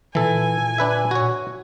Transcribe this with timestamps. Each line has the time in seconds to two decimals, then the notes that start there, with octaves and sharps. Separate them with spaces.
0.15 A#2 E3 A4 G#5
0.78 D4 B4 E5
1.11 F#4 C#5